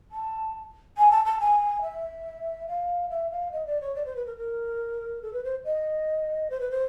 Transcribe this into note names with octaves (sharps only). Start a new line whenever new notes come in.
A5
G#5
A5
A5
G#5
E5
F5
E5
F5
D#5
D5
C#5
D5
C5
B4
A#4
A#4
A4
B4
C5
D#5
C5
B4
C5